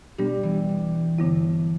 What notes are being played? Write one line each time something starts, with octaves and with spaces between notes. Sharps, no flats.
B2 G3 B3 D4 G4
E3
G3
G2 D3 A3 B3 E4